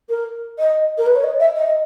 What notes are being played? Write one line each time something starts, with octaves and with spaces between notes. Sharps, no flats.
A#4
D#5
A#4
B4
C#5
D#5
E5
D#5